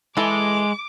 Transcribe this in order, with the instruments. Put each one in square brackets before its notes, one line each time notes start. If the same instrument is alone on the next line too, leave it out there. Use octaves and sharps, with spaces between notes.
[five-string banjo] E3 A4 [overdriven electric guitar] G#3 [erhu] D6